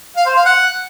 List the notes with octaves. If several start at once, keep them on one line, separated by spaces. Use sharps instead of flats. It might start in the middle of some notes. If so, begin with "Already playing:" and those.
F5
C5
F5
F#5